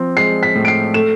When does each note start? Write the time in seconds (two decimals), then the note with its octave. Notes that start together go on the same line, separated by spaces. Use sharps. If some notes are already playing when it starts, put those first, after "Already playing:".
Already playing: F3 C4
0.17 G#3 C7
0.43 B6
0.55 A2
0.65 D7
0.68 C7
0.94 A3 E7